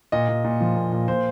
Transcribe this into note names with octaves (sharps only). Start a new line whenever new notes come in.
A#2 D#5
A#2
A#2
F3
A#2
A#2
A#2 C5